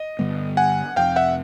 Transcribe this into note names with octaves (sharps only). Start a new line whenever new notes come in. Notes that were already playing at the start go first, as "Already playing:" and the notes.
Already playing: D#5
G2 D3 G3 B3
F#5 G#5
F1 F2 C3 F5 G5
E5 F#5